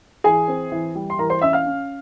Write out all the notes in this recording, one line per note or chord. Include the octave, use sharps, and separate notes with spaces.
E3 G#4 G#5
C4
E3
G3
C6
E3 A#4 A#5
C5 C6
C#4 E5 E6
F5 F6
C#4